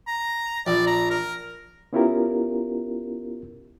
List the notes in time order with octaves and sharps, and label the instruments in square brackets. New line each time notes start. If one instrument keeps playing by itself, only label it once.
[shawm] A#5
[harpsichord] A#1 [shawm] D5
[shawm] A#5
A#4
[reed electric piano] B3 C#4 E4 F4 G4 A#4